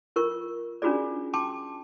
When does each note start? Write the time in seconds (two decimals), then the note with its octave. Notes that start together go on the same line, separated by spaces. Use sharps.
0.16 F4 A#4 C#6
0.82 C#4 D4 F4 F#4 G#4 D5
1.33 G5 A5 C6 D6